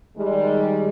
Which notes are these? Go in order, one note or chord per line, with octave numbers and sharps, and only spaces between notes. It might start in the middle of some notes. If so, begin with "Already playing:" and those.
D#3 G3 G#3